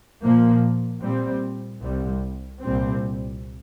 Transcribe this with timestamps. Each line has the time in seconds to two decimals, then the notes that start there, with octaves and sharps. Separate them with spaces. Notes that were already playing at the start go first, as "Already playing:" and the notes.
0.23 A#2 F3 A#3
1.02 A#2 G3 C4
1.82 C2 C3 G3
2.61 C2 A#2 G3 C4